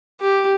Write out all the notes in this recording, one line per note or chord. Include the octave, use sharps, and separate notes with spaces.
G4